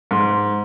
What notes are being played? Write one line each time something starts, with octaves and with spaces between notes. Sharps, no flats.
G#2